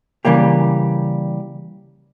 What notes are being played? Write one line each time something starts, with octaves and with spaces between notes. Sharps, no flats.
C#3 E3 G3 A#3 G4